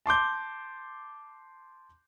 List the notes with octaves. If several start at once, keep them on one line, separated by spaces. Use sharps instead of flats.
A5 C6 D6 G6